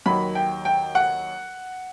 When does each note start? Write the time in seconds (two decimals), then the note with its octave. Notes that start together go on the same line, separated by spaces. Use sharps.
0.06 D#2 D#3 F#3 B5
0.35 G5
0.65 G5
0.95 F#5